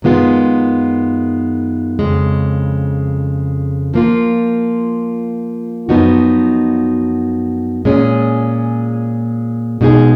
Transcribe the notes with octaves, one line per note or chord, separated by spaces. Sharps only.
F#2 D#3 G#3 B3 F4
F2 C#3 G#3
F3 A#3 F4
F#2 F3 B3 D#4 F#4
A#2 G#3 C#4 G#4
B2 G#3 D#4 G#4